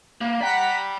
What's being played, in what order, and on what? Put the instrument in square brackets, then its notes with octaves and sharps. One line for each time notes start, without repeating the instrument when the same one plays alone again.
[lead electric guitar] A#3
[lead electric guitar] D5 G5 [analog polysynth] F#5 A#5 B6